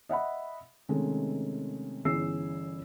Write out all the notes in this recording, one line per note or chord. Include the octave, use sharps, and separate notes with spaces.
D#5 E5 F#5 B5
C3 D#3 G#3 A3 C#4
G1 E3 C#4 G#4 E6 C7